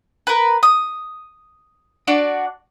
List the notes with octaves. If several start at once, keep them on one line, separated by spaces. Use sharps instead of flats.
A#4 B4
D#6
D4 F#4 D5